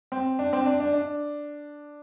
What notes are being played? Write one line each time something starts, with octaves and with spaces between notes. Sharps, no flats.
C4
D4
C4
D4
D4
D4